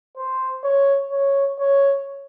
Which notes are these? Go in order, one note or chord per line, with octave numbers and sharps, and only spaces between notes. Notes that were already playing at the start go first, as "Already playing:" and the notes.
C5
C#5
C#5
C#5